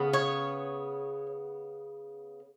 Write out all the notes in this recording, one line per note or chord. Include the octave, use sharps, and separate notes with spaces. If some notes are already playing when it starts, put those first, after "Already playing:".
Already playing: C#3 B3
C#5